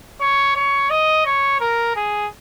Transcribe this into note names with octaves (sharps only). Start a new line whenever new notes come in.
C#5
C#5
D#5
C#5
A#4
G#4